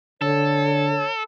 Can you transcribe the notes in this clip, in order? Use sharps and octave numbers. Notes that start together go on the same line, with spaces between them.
D3 A4 C#5